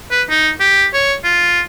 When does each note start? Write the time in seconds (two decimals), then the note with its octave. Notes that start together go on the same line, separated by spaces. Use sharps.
0.11 B4
0.30 D#4
0.60 G4
0.94 C#5
1.24 F4